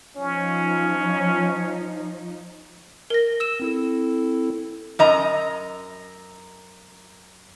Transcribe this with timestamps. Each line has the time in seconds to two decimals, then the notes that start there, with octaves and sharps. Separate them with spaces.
0.17 F3 C#4 D#4
3.10 A#4 A#6
3.40 E6 E7
3.60 C4 E4 A4
4.99 F#2 D#5 A#5